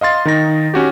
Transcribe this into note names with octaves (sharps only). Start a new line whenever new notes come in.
D#5 F5 C6 A6
D#3 D#4 A#6
C#4 F#4 G4